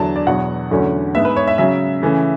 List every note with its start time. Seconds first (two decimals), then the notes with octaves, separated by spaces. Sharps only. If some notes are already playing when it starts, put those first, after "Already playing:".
Already playing: E2 D3 F#3 A5
0.16 D5
0.27 E2 B2 F#3 F#5
0.71 E2 D3 F#3 A3 C#4
1.15 G#2 G#3 B3 E5
1.25 B4
1.36 C#5
1.47 E5
1.58 C#3 F#3 C#4 E5
2.02 C#3 E3 A3 C#4